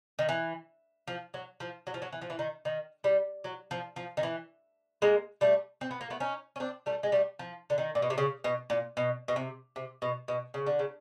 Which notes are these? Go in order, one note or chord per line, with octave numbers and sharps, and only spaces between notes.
D#3
E3
F3
F#3
F3
F#3
F3
F#3
E3
F3
E3
D#3
D#3
G3
F#3
F3
F3
D#3
E3
G#3 A#3
G3 A3
C4
B3
A#3
A3 B3
C#4 D#4
C#4
C4 D4
G3 A3
G#3
G3 A3
F3
D3
D#3
A#2
B2
C3
C#3
B2
A#2
B2
B2
C3
C3
B2
B2
C#3
D3
C#3